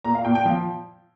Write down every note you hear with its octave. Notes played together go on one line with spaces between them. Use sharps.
A#2 A#5
F5
A#2 G5
G5
F3 F5